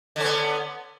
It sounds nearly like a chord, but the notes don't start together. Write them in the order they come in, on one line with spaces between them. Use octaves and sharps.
D3 C#4 B3